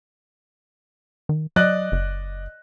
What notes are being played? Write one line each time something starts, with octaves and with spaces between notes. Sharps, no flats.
D#3
F#3 D5 D#5 F#6
F#1